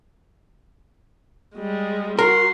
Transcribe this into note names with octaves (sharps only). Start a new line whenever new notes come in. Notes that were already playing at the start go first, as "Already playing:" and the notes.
G3 G#3
F#4 A#4 C6